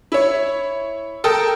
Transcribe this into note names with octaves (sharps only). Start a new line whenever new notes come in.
E4 C#5
A4 A#4 G5 D#6